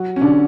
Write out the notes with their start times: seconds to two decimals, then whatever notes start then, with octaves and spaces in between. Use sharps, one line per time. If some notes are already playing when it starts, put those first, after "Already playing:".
Already playing: F#3 F#4
0.16 C#4
0.21 D3 D4